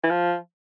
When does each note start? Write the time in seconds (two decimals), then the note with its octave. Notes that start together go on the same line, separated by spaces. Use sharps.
0.04 E3
0.11 F3